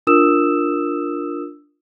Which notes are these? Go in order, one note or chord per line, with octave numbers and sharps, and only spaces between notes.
D4 F4 A#4 D#6 E6 E7